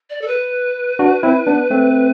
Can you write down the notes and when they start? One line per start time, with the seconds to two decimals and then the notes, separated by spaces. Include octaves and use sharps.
0.10 D5
0.21 A4
0.27 B4
0.99 D4 F#4
1.23 C4 E4
1.47 B3 D4
1.70 A3 C4